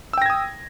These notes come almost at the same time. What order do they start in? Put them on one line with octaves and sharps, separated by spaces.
E6 G5 A#6 G#6 D#6